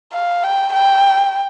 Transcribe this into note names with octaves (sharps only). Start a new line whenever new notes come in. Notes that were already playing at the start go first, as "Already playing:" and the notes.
F5
G5
G5